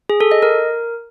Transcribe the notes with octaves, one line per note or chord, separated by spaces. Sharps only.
G#4
A4
D#5
A#4